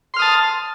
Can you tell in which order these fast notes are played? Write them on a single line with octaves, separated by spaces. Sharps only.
C6 F6 D#6 A5